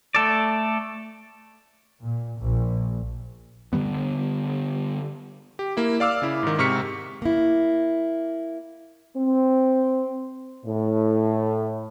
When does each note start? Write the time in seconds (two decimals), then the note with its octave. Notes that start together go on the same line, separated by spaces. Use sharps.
0.15 A3 A4 D5
2.01 A#2
2.37 A#1
3.73 D3 E3 G3 B3
5.59 G4
5.77 A#3 E4
6.00 D5 F5 D6 E6 F6
6.22 C#3 E4
6.43 G#2 D#3
6.58 G#2 C3 C#6 F6 B6 C#7
7.22 A#3 E4
9.16 C4
10.65 A2